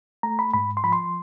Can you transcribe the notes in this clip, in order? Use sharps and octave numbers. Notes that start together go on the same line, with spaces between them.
A3 A#5
B5
G#2 B5
C6
F3 B5
C6